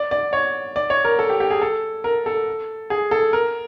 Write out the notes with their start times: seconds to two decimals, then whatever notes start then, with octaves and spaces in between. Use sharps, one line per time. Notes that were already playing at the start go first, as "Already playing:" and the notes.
Already playing: D5
0.11 D5
0.33 C#5
0.76 D5
0.90 C#5
1.05 A#4
1.19 A4
1.29 G4
1.40 G4
1.50 G#4
1.62 A4
2.04 A#4
2.26 A4
2.90 G#4
3.11 A4
3.33 A#4